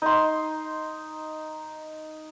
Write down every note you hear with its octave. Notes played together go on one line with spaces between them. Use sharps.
D#4 C6